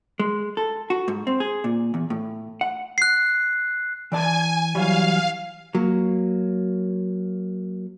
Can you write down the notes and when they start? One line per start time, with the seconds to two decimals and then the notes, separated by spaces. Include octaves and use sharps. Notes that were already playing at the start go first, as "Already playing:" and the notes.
0.20 G#3
0.57 A4
0.90 F#4
1.08 G#2
1.27 C4
1.40 G#4
1.64 A#2
1.94 E2
2.10 A2
2.61 F#5
2.98 F#6 C7
4.12 E3 D5 G#5 A5
4.75 E3 F#3 G3 F5
5.75 F#3 A#3